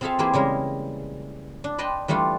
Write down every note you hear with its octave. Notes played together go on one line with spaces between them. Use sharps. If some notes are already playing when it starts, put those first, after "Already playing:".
C4 F4 G#4 A4 E5 F5
E3 A#3 E4 G4 G#4 C5
C#3 G3 G#3 A#4
D4
B4 D5 D#5 G5 A5 C6
E3 G3 A3 D4 F4